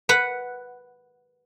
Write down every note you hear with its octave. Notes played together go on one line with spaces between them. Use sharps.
B4 F#5